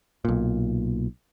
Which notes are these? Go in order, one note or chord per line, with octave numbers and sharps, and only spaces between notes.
B1 A#2